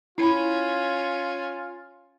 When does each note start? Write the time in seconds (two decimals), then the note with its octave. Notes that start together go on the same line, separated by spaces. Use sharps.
0.18 C#4 E4 F4 B5